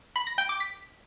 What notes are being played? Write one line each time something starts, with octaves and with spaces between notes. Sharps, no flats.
B5
A#6
G5
D6
B6